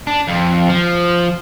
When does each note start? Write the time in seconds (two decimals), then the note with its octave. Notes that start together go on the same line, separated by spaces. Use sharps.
0.07 D4
0.28 F2
0.69 F3